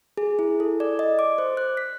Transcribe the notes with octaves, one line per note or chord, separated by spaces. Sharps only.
G#4
E4
A4
D5
D#5
D6
C5
F#6
B6